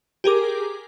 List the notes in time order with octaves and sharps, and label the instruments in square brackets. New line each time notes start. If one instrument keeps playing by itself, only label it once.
[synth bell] G4 G#4 A#4 D6